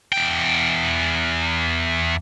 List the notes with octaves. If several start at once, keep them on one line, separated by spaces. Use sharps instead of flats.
E2 G5